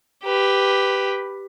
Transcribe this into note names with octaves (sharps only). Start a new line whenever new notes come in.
G4 B4